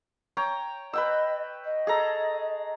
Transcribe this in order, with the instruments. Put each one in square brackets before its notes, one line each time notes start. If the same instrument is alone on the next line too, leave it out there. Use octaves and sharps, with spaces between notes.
[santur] C#5 G5 A#5
[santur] B4 G5 E6 [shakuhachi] D#5
[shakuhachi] D#5
[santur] G#4 A4 A#5